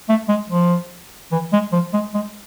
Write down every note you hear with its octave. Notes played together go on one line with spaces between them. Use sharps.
A3
G#3
F3
E3
G#3
F3
G#3
G#3